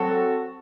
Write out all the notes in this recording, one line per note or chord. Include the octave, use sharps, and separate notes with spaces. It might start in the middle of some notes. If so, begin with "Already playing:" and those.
Already playing: F#3 C4 F#4 A4